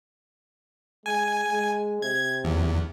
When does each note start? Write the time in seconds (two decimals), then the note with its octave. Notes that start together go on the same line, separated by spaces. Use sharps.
1.06 G#3 G#5
1.51 G#3
2.02 C3 G#6
2.44 E2